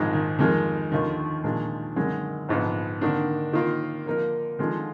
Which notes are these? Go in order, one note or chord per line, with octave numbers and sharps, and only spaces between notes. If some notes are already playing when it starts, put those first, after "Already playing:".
Already playing: A#1 G#2 D#3 F3 G#3
D#3
F2 D#3 F3 G#3 D#4 A#4
D#2 D3 D#3 F3
A#2 F3 G#3 D4
F#2 D3 D#3 G#3
A#1 G#2 F3 B3
D3 D#3 A#3 D4
D#3 A#3 F4
F3 A#3 D#4 A#4
D3 D#3 F3 G#3 D4 F4